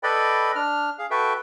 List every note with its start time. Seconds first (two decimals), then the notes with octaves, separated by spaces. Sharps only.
0.03 A4 B4 D5 D#5 G5 B5
0.55 D4 F6
0.99 G#4 F5
1.11 F#4 A4 B4 E5 G5